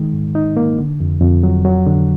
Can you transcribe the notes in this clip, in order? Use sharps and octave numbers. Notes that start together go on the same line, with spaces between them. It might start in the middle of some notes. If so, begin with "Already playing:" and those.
Already playing: D#3 G#3
G#2
D#4
A#3
D3
F2
F2
F#3
F#3
D3